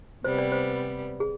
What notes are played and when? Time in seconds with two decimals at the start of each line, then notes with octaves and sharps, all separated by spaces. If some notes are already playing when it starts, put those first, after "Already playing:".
0.24 C3 G3 B3 C5
0.38 D5
0.52 C5
1.20 G#4